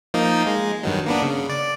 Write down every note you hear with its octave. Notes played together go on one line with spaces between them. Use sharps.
F3 A#3 D#4
G#3
G2 D#3 F#3
A#3 B3 D4
C#3
D5